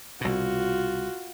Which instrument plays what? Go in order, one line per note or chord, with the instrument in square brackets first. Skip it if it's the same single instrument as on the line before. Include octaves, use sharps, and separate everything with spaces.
[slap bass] C2 B2 [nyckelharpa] F4 F#4